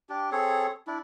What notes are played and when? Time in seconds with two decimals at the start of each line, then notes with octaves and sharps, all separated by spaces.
0.09 D4 G4
0.32 C4 G#4 A4 C#5
0.87 D4 E4